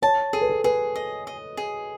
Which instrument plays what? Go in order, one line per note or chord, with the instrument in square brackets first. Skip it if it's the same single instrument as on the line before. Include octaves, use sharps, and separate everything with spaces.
[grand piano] C#5 [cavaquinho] A5
[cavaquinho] G#4 [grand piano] A4
[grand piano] B4
A4
[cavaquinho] G#4 [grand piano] B4
[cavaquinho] D#5
D#5
G#4